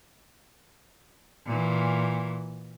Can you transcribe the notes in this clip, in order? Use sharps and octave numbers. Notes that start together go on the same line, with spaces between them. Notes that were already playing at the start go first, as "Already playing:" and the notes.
A#2 E3